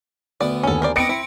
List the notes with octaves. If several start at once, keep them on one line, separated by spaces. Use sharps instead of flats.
D2 B3 D5
D#2 C#4 A4 G#5
A#4 C5 D5
B3 C4 D4 D#5 A#6 C#7 D7
C4 E4